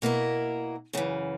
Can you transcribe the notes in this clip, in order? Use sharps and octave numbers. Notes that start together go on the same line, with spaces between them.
B2 A#3 E4 A#4
F#2 C#3 E3